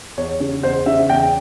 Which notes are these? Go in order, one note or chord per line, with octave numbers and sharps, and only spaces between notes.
E2 C#5
C#3
E2 C5
C#3 E5
E2 G5